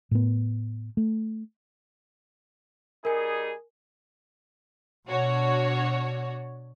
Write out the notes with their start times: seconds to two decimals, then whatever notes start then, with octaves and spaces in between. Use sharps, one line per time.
0.11 A2 B3
0.97 A3
3.05 G3 D#4 G#4 A#4 G#5
5.08 B2 D4 F#4 C#5